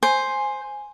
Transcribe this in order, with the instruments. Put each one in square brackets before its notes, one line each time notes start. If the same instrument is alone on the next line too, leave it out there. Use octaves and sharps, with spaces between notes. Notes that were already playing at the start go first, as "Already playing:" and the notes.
[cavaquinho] C5 [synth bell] G#5